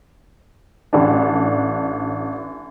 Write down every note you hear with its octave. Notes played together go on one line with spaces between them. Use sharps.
A1 D4